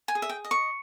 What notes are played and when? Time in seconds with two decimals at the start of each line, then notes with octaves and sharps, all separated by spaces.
0.08 G#5
0.15 G#4
0.22 E5
0.29 G5
0.44 D#5
0.51 C#6